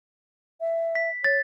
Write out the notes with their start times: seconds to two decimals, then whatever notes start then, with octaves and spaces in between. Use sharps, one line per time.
0.61 E5
0.95 B6
1.24 C#5 A6